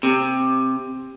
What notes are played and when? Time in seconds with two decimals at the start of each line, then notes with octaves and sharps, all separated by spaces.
0.03 C3